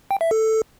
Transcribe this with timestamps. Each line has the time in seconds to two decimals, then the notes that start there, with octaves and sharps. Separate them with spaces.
0.11 G5
0.21 E5
0.31 A4